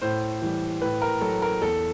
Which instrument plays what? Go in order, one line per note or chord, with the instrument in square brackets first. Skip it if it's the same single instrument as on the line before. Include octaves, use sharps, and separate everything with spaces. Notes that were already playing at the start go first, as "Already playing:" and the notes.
[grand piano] A2 C5
E3 G3
A2 B4
A#4
F#3 A4
A#4
E2 A4